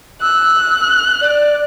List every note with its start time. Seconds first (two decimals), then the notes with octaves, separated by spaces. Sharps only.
0.22 E6 F#6
1.21 D5